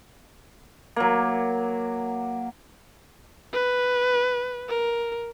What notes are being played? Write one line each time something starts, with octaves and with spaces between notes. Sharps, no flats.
F#3 A#3
B4
A#4